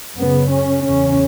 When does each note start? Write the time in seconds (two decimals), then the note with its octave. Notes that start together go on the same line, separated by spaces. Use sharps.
0.18 F#2 C#3 B3
0.50 C#4
0.84 E2 C#3 C#4